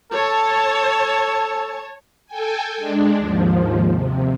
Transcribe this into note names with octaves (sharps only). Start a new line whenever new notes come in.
A4 C#5 A5
A4 G5 G#5
G#3 D4
D#2 G#2 F3
C3